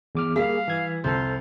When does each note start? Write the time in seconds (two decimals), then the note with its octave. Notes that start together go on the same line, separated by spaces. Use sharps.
0.15 E2 D6 F6
0.36 G3 A#3 G#4 F5
0.68 E3 G#6
1.04 C2 F2 F4 A4 C5